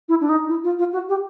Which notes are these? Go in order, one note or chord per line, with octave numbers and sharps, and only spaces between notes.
E4
D4
D#4
E4
F4
F4
F#4
G4